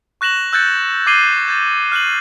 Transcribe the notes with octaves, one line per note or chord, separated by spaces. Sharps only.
C#6 F#6 A#6 E7 F#7
E6 F#6 G6 A6 C#7
D6 G#6 C7 D#7 F#7 G7
G6 A6
F6 F#6 D#7 F#7